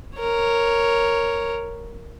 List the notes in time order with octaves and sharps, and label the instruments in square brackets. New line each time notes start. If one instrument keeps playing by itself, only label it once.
[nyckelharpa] A#4 C#5